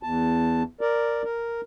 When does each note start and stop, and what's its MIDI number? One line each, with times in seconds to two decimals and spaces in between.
0.03 0.63 40
0.03 0.63 81
0.81 1.23 70
0.81 1.23 74
1.24 1.61 70